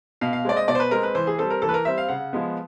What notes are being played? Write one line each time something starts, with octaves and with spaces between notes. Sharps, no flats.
B2 F5
F5
G#3 C4 D5
D#5
B2 D5
C5
B4
G#3 C4 A#4
B4
E3 C5
G#4
G3 C4 A4
A#4
E3 A4
B4
A#4
G3 C4 E5
F5
C#3 F#5
F3 G#3 B3